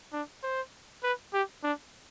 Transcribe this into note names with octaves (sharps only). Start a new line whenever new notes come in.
D4
C5
B4
G4
D4